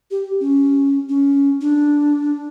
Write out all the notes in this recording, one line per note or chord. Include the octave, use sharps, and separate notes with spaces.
G4
C#4
C#4
D4